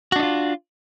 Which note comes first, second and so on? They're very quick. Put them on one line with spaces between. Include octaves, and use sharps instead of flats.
F#4 D4 D#4 F4